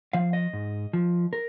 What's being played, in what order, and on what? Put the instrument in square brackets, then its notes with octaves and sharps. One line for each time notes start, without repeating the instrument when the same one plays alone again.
[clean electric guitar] F3 F5
D#5
G#2
F3
A#4